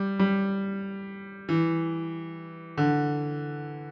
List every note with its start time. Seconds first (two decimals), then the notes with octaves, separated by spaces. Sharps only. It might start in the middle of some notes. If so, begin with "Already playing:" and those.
Already playing: G3
0.19 G3
1.49 E3
2.77 D3